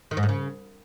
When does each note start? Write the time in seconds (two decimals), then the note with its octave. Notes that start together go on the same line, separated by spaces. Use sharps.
0.11 D#3
0.17 G#2
0.23 A2
0.29 C#3